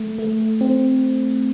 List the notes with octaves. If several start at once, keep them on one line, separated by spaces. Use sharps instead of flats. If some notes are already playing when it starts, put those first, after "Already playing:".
Already playing: A3
A3
C4